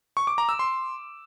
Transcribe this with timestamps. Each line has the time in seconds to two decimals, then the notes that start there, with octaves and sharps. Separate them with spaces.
0.17 C#6
0.27 D6
0.38 A#5
0.49 E6
0.59 C6